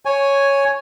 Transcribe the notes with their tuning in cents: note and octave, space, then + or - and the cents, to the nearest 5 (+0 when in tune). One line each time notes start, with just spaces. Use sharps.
C#5 +0 G#5 +0